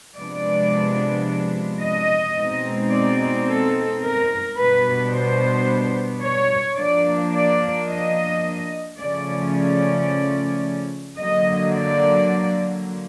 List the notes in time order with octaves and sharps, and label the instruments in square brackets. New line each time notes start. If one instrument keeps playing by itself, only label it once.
[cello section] C3 F3 G#3 B3 D4 D5
D#5
B2 G#3 C4 D#4
D5
A4
A#4
B2 G3 B3 D4 B4
C5
C#5
F3 A#3 D4 D5
D5
D#5
C#3 F3 A3 C#4 D5
D5
D3 F#3 A#3 D#5
D5